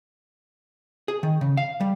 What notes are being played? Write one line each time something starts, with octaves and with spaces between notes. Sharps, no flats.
G#4
D#3
C#3
F5
G3